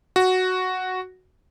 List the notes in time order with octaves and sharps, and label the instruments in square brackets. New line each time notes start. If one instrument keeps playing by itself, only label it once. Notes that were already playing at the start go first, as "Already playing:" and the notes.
[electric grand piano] F#4